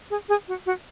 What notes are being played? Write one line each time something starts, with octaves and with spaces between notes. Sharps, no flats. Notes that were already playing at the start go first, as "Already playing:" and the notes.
G#4
G#4
F#4
F#4